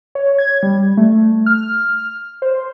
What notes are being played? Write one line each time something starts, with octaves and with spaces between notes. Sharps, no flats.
C#5
G#6
G3
A3
F6
C5